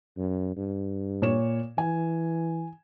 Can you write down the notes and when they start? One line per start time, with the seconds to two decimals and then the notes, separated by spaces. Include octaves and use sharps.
0.17 F#2
0.56 G2
1.22 A#2 C#5 E7
1.78 E3 G#5